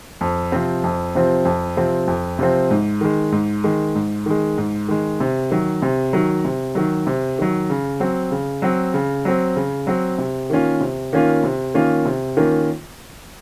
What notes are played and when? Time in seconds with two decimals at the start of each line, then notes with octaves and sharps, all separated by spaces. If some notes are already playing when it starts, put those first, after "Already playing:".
0.21 F2
0.52 C3 F3 C4
0.84 F2
1.15 C3 F3 C4
1.45 F2
1.77 C3 F3 C4
2.08 F2
2.39 C3 F3 C4
2.71 G#2
3.01 D#3 G#3
3.32 G#2
3.64 D#3 G#3
3.95 G#2
4.26 D#3 G#3
4.58 G#2
4.88 D#3 G#3
5.20 C3
5.51 D#3 F#3
5.82 C3
6.13 D#3 F#3
6.45 C3
6.75 D#3 F#3
7.07 C3
7.39 D#3 F#3
7.70 C#3
8.00 F#3 C4
8.31 C#3
8.62 F#3 C4
8.94 C#3
9.25 F#3 C4
9.56 C#3
9.87 F#3 C4
10.18 C3
10.50 D#3 A#3 C#4 F4
10.80 C3
11.13 D#3 A#3 C#4 F4
11.44 C3
11.74 D#3 A#3 C#4 F4
12.05 C3
12.37 D#3 A#3 C#4 F4